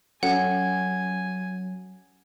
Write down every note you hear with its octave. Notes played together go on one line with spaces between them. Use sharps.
F#3 C#4 A4 F#5 G#5